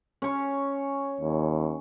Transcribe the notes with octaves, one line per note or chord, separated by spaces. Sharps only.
C#4 C#5
D#2